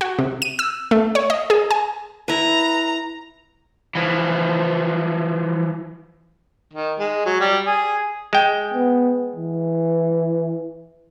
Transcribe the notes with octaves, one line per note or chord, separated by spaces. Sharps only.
F#4
C3
D#7
E6
A3
C#5
D#5
G#4
G#5
E4 B4 A#5
E3 F3
D#3
G#3
F#3
G3
G#4
G#3 G5
B3
E3